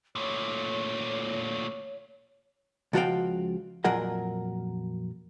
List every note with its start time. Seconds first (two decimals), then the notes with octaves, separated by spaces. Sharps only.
0.15 A#2 A3 C#5
2.93 C#2 F3 F#4 A#4 F5 G5
3.84 F2 A#2 F#3 F4 A#4 F#5